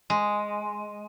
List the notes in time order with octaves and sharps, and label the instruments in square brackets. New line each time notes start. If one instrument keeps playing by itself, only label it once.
[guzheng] G#3